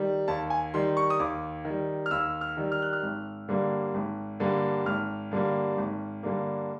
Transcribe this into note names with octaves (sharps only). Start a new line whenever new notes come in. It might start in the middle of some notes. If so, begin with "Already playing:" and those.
Already playing: D#3 G3
D#2 A5
G#5
D#3 G3 C6
C#6
D#6
D#2 D6
D#3
G3
F6
D#2 E6
F6
D#3 G3
F6
F#6
F6
G#1
G2 D3 G3 A#3
G#1
G2 D3 G3 A#3
G#1 F6
G2 D3 G3 A#3
G#1
G2 D3 G3 A#3